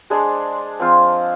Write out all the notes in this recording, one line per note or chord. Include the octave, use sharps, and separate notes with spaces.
G#3 D4 G#4 C5
F3 C4 F4 C5